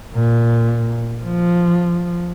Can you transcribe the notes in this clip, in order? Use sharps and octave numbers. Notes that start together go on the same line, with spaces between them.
A#2
F3